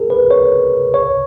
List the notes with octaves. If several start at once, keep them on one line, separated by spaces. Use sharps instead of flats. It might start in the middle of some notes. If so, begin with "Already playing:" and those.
Already playing: G#4 A#4
B4
C#5
C#5